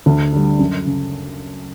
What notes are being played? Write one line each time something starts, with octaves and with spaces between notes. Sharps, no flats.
D2
D3 G3
F#2
C#3